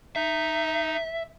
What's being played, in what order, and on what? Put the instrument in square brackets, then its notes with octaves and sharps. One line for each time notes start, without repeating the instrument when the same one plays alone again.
[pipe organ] D#4 [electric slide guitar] E5